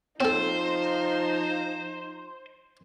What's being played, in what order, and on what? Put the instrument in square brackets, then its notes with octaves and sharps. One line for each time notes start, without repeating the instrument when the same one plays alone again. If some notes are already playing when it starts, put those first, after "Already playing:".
[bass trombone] F3 [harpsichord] C4 A4 [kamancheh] D#4 [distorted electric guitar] C5